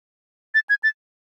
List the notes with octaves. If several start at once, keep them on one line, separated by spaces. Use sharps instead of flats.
A6
G#6
A6